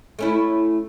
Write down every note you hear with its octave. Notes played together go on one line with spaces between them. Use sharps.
A3 C#4 E4